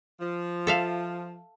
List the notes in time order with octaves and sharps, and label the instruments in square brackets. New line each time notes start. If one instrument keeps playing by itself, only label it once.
[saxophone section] F3
[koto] A4 E5 F5